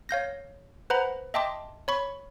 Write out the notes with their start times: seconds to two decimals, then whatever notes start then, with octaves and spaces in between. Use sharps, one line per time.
0.09 C#5 F5 G6 A#6
0.90 B4 C5 F#5 A#5 B5
1.34 D#5 E5 G5 A5 C6 D6
1.88 C#5 B5 C#6